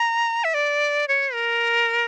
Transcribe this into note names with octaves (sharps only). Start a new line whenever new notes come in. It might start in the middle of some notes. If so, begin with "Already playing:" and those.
Already playing: A#5
E5
D5
C#5
A#4